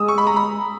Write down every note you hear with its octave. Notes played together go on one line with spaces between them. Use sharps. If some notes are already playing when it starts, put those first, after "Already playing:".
Already playing: G#3 D#6 E6
C#6
B5
A#5
B5